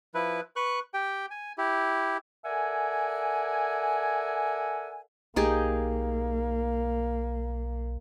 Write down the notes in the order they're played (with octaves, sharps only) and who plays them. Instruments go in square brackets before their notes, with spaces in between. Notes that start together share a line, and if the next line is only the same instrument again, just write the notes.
[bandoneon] F3 E4 B4
B4 C#6 F#6
G4 G5
G#5
E4 G4
[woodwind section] A4 A#4 D5 E5 F#5 G#5
[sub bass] B1 [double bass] A#3 [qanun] D#4 G4 G#4